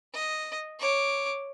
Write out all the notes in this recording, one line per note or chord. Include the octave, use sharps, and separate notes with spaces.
D#5
C#5 D6